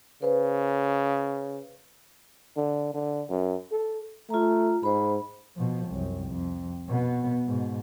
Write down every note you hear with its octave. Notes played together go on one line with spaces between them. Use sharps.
C#3 B4 C5
D3
D3
F#2
A4
A3 F4 A#5
G#2 C5 B5
B2 F3
C2 F#2
F2
B2 B3
G#2 B2